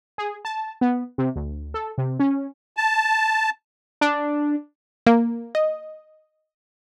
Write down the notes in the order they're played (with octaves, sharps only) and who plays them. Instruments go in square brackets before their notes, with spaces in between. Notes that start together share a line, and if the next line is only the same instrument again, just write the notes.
[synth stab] G#4
A5
B3
C3
D2
A4
C3
C#4
[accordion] A5
[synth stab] D4
[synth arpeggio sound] A#3
D#5